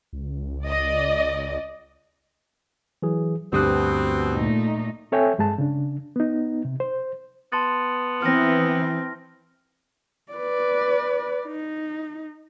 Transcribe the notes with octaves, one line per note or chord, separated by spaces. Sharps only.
C#2
D5 D#5
E3 F#3 G#4
D2 G2 B2 C4 G4 D#6 F#6
A#2 A3 D#4
C4 A4 C#5 E5 G5 G#5
G2 G#3 G#4 A5
C#3 D4
B3 D#4
C3
C5
B3 A5 C6 A6
E3 C4 F6 A#6
B4 D5
D#4